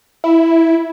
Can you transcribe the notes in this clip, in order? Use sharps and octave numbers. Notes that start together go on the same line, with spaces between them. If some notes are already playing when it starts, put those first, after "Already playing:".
E4